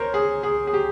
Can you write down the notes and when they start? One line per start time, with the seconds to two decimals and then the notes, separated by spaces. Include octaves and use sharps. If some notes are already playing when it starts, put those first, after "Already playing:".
Already playing: A#4 C5 C#5
0.14 G#4
0.43 G#4
0.67 G#4
0.74 G4